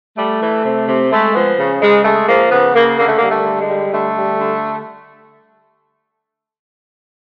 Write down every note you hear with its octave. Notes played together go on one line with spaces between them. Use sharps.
G3 A3
E3
C3
C3
G#3 A3
F3 B3
C#3
C#3 G#3
G#3 A3
F3 A#3
C#3 B3
C#3 A#3
D3 A#3
A3
G3 A#3
A3
D3
G#3
G3
D3 A3
G3
D3